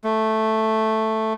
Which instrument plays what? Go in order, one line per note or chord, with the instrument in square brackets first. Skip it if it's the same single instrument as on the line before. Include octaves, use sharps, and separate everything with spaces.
[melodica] A3